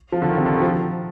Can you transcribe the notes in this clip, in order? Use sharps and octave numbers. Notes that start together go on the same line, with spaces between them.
F3
D3
D#3
C3
D3
D#3
F3